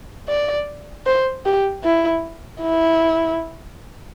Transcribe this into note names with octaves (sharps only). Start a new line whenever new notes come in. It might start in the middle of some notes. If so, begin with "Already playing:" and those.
D5
C5
G4
E4
E4